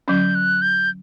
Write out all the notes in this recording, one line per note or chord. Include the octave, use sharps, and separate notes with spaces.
D3 F#3 C#4 G6
F#6
G6